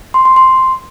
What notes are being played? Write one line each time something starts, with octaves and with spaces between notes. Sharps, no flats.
C6
C6
C6